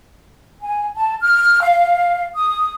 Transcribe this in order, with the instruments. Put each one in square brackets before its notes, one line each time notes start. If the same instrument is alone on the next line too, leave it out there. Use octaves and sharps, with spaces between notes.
[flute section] G#5
A5
F6
F5
D#6